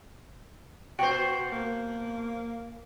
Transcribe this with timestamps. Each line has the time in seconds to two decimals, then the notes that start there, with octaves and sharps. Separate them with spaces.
0.99 B2 F#4 C5 G5
1.53 A#3